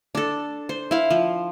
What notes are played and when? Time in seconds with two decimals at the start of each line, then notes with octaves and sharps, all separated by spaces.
0.15 D4 A4
0.69 C5
0.91 E4 F5
1.10 F3